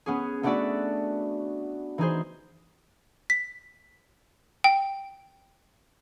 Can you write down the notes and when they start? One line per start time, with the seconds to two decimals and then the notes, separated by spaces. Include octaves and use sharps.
0.06 B3 C#4 G#4
0.43 A3 B3 D4 F#4 D5 E5
1.98 E3 D#4 G#4 C5
3.30 B6
4.64 G5